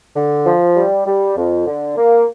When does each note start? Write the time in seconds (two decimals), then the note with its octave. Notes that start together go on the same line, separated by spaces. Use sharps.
0.16 D3
0.46 F3
0.77 G3
1.06 G3
1.36 F2
1.67 D3
1.97 A#3